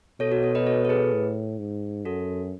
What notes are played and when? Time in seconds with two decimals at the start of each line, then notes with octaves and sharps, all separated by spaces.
0.20 B2 A4 C#5
0.32 F#4 A4
0.43 A4 C#5
0.55 B4 D#5
0.66 A4 C#5
0.85 A4
0.89 G#4 B4
1.13 A2
1.59 G#2
2.05 F#2 F#4 A4